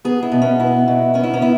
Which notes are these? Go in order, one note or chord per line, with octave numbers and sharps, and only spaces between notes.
B3 G#4
E4
B2
C#4
B3 E4
B2
B3 C#4
E4
C#4
B3 E4